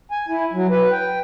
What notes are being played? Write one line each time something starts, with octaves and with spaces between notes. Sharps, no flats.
G#5
E4
F#3
B4
G5